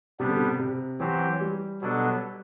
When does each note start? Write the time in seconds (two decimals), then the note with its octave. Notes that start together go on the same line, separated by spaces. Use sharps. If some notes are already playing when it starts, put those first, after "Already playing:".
0.20 C3 G3 B3 D4
0.29 D3
0.37 C3
0.59 C3
1.00 E3 F#3 C4 G4
1.41 G3
1.81 B2 F#3 B3 D4 A4